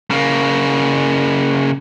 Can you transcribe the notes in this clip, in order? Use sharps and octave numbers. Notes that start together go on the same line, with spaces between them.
C#3 A#3